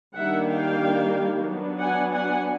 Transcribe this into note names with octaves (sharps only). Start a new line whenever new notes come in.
D#3 G3 A#3 D4 E5 F#5
F5 G5
F#3 B3 D4
F#5 G#5
F#5 G#5